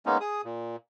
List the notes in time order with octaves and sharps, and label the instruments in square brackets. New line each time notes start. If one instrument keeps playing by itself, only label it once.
[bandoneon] G#3 A#3 B3 C#4 D#4
G#4 D#6
A#2